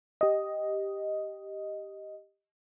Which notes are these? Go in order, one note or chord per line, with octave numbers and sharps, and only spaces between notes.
G4 D#5